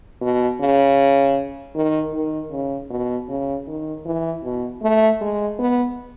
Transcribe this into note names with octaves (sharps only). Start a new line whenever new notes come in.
B2
C#3
D#3
D#3
C#3
B2
C#3
D#3
E3
B2
A3
G#3
B3